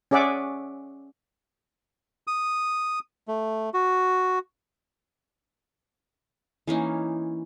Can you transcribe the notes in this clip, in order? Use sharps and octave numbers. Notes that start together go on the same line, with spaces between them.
C#4 G#4 D5 E5 F#5 D6
D#6
A3
F#4
E3 A#3 C#4 D#4